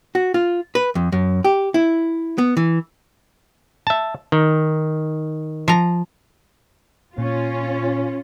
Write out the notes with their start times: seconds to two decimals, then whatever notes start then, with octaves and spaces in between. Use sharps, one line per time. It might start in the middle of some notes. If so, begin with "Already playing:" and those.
0.15 F#4
0.34 F4
0.75 B4
0.95 F2
1.12 F#2
1.45 G4
1.74 E4
2.38 B3
2.57 E3
3.87 E5 A5
4.32 D#3
5.68 F3 A#5
7.18 A#2 C#4 F4